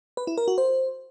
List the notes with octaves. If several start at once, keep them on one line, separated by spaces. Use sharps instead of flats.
B4
E4
A#4
F#4
C5